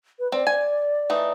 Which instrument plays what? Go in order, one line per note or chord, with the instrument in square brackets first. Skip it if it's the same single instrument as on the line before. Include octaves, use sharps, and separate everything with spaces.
[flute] B4
[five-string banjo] C4 [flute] D5
[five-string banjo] G#5
E3 A3 D#4